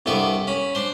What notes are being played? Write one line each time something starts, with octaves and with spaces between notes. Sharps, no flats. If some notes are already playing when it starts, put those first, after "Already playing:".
C2 G2 B3 A4 D5 C#6
C#4 B5
D4 C5